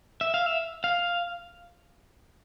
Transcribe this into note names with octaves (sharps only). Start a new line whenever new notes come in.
E5
F5
E5
F5